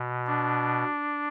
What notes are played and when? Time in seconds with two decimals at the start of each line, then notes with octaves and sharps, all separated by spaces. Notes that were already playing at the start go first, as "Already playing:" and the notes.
Already playing: B2
0.27 D4